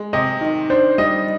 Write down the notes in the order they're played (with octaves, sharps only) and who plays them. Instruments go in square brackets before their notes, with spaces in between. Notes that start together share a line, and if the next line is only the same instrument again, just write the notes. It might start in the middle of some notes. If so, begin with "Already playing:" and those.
Already playing: [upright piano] G#3
[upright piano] C3 [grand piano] D#5
[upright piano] D#3
[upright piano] D4 [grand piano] C5
[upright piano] G3 [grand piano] D#5